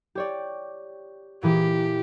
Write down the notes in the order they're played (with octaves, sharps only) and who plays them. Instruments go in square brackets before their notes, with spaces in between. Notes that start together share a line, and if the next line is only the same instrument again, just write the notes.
[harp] G4 C#5 D5
[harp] A#2 E3 G#4 [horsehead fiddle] G4